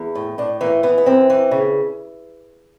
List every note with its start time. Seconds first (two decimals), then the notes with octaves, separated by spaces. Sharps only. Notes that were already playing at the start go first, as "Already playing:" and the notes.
Already playing: E2
0.15 A2
0.38 A2 D4
0.61 E3 A#3
0.83 E3 B3
0.98 B3
1.06 F#2 C4
1.30 E3
1.51 C#3